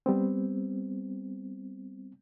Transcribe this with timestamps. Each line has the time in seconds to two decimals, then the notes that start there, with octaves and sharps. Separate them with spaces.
0.06 G3 B3 C4